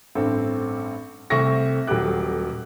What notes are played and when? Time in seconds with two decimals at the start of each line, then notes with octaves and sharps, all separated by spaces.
0.15 A1 G2 C4 A4
1.30 C2 A3 C4 E5 C#6 A#6
1.87 D#1 F#3 A3 G4 D6 F#6